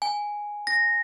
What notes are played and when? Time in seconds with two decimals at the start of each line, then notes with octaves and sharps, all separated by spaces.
0.02 G#5
0.67 A#6